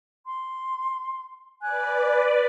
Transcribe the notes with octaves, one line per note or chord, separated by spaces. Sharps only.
C6
B4 D5 G#5 F#6